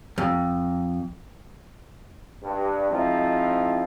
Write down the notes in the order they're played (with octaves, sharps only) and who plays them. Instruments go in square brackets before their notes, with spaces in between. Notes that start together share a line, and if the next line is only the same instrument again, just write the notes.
[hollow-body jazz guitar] F2
[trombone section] G2
F3 G#3 C4 D#4 E4